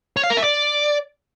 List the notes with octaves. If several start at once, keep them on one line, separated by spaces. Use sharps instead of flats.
C#5
F5
A#4
E5
D5